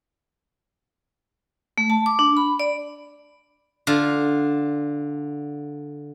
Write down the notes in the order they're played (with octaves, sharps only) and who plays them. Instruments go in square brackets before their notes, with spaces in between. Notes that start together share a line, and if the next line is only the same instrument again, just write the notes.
[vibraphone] A3
A5
D6
D4
B5
D5
[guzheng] D3 F4